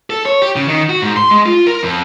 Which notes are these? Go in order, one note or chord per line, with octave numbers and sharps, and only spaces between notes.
A4
C#5
G4
C#3
D#3
F#4
G#2
C6
G#3
F4
A#4
F2